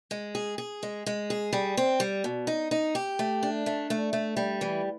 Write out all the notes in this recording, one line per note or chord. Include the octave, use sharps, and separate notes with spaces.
G#3
G#4
G#4
G#3
G#3
G#4
G3
C4
G3
B2
D#4
D#4
G4
A3
D4
A3
A3
A3
G3
E3